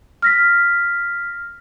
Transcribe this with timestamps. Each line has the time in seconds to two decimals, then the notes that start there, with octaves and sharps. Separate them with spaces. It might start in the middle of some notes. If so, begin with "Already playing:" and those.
0.22 F6 A#6 B6